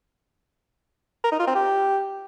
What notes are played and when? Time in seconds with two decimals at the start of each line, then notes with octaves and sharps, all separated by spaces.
1.24 A#4
1.32 D#4
1.39 F4
1.47 C4
1.55 G4